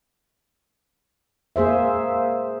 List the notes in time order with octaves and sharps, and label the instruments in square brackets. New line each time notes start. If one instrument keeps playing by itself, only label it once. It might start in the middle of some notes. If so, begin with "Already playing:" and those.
[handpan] A#3 G#4 C5 E5